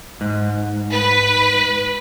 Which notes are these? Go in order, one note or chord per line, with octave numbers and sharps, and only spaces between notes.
G#2
B4